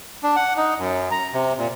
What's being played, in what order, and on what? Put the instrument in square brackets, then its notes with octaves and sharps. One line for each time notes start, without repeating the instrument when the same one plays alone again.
[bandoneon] D4
F#5
D#4
F#2
A#5
C3
A#2